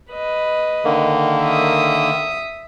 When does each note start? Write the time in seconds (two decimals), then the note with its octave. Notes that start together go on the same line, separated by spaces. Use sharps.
0.10 B4 D#5
0.85 D3 D#3 A#3
1.42 E5 D#6